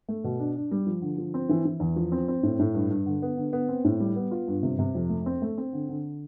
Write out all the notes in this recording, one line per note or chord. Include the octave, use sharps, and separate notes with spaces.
A3
B2
D4
D4
G3
F3
D3
F3
C4
E3
E3
E2
F3
C4
C4
A2
A2
G2
G2
D3
B3
D3
B3
C4
A2
G3
B3
F4
G2
C3
C3
F2
A3
C4
A3
C4
D3
D3